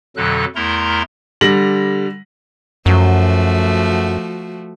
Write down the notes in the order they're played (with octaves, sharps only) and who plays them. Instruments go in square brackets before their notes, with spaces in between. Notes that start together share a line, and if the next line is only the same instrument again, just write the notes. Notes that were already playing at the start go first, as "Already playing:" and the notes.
[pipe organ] F2 B2 D3 F#3 A4 F#6
E2 A3 E4 A#4 A#5 C6
[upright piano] D3 G3 A#6 F#7
[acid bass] F#2 [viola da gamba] F3 A3 F#4